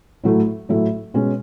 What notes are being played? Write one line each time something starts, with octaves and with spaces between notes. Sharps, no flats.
A2 F#3 A3 E4
A2 F#3 A3 E4
B2 G#3 C#4